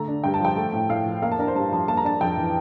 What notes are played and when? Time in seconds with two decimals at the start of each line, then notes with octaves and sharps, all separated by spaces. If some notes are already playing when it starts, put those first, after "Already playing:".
Already playing: D3 A3 A#5
0.08 D4
0.24 G2 G5
0.34 A5
0.40 F3 G5
0.56 A3
0.73 A2
0.89 A2 F5
1.06 F3
1.22 A#3 F5
1.32 A5
1.39 D4 A#4
1.48 C5
1.55 G2 A5
1.72 F3 A5
1.88 A#3 A5
1.97 A#5
2.04 D4 A5
2.21 F2 G5
2.37 E3